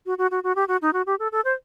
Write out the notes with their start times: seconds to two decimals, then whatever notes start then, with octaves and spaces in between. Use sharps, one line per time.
0.06 F#4
0.18 F#4
0.31 F#4
0.44 F#4
0.56 G4
0.68 F#4
0.82 D#4
0.93 F#4
1.06 G4
1.19 A4
1.32 A4
1.45 C5